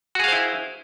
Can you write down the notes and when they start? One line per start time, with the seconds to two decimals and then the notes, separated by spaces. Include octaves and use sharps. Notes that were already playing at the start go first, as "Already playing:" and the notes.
0.15 F#4
0.20 G#4
0.24 F5
0.28 C5
0.32 E4